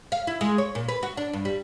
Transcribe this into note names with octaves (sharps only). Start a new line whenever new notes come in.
F5
E4
G#3
C#5
A#2
B4
F#4
D4
G2
G3